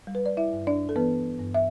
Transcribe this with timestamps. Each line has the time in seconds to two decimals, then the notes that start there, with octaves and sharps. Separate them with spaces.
0.07 G3
0.15 B4
0.26 D5
0.37 E4 E5
0.52 G2
0.67 D4 D5
0.89 A4
0.96 E3 B3 B4
1.40 G2
1.54 E5